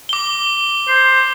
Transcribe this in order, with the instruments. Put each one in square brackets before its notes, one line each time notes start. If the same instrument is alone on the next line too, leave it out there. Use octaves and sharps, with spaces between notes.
[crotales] D6 G7
[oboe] C5